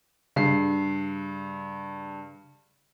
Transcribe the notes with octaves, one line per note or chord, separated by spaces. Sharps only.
G2 C#3 C7